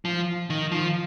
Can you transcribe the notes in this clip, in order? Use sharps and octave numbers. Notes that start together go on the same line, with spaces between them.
F3
D#3
F3